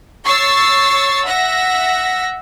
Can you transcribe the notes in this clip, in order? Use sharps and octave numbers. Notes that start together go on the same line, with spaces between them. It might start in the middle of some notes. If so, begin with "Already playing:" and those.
C#5 C#6 E6 A6 C7
E5 F#5 A#6